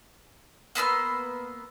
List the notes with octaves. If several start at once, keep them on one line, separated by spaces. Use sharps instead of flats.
A#3 B3 C6 E6